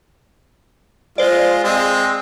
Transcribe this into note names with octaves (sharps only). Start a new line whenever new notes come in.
G#3 F4 C5 D5
G#3 C4